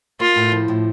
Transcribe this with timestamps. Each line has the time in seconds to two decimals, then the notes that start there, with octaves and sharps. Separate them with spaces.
0.20 A#3 F4
0.36 A2
0.52 F3
0.68 A2